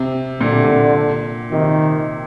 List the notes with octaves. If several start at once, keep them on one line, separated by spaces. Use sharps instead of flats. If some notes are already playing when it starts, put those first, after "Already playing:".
Already playing: C3
A#2 D3
C3
A#2
C3 D#3